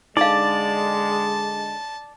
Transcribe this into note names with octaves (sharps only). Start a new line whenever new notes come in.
D3 G#3 D#4 D5 F5 A5